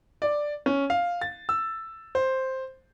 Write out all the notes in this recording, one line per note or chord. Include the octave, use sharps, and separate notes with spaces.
D5
C#4
F5
A6
E6
C5